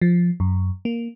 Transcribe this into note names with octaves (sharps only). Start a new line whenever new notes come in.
F3
F#2
A#3